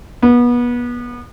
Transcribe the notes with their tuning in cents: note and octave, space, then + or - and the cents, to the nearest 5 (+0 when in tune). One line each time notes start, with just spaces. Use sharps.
B3 -30